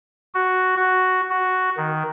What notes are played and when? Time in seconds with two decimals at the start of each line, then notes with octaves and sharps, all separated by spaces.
0.35 F#4
0.77 F#4
1.30 F#4
1.77 D#3